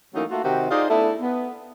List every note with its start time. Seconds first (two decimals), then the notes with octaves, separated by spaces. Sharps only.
0.15 E3 F#3 A3 A#3 C#4 D#4
0.31 A3 A#3 F4 F#4
0.44 C3 D#3 C4 F#4 G4
0.71 D#4 F4 G#4 C5 D5
0.90 A3 B3 D4 E4 A4
1.21 B3